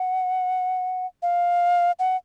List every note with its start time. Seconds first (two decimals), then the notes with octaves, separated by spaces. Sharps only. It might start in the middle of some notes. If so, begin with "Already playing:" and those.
Already playing: F#5
1.22 F5
1.99 F#5